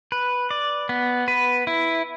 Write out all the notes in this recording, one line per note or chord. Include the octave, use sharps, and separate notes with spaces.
B4
D5
B3
B4
E4